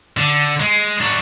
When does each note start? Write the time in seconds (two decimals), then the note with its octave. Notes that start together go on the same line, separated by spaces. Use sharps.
0.17 D3
0.60 G#3
1.01 F#3 D4